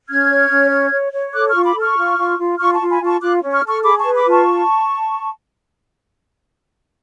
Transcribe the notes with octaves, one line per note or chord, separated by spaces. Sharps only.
C#4 F6 G#6
C#5
C#4
C#5
C#5
C#5
A4 D6 F#6
F4 C#6 F6
B5 D6
A4
C#6 F6
F4
F4
F4
F4 C#6 F6
A5 C#6
F4
G#5 B5
F4
A5 C#6
F4 D6 F#6
C#4
C#6 F6
A4 C#6 F6
G#4 B5 D6
A5 C#6
B4
B5 D6
F4 A5 C#6